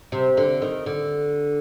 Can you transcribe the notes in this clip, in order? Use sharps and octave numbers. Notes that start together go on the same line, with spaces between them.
C3
D3
D#3
D3